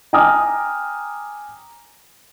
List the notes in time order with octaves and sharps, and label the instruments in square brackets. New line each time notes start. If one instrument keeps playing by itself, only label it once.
[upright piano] G5 G#5 A#5 D6 D#6 F6